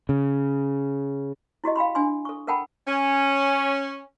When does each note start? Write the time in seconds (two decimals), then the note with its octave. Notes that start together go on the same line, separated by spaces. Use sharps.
0.09 C#3
1.64 E4 F#4 G4 D#5
1.76 F5 G5 B5 C6
1.95 D4 G#5 C6
2.25 A4 C#6
2.47 A4 A#4 F#5 G5 A5 B5
2.87 C#4